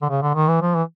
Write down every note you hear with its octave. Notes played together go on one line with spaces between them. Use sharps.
D3
C#3
D3
D#3
E3
F3
E3